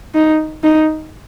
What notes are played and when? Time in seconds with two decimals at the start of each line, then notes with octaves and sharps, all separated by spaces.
0.15 D#4
0.64 D#4